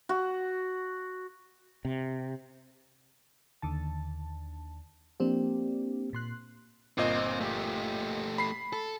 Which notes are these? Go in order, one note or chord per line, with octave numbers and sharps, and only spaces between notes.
F#4
C3
D#2 D3 A5
F3 A#3 C4 D4 G4
A#2 C6 F#6
G1 A#2 C4 D#5
A3 G4
B5 C7
A4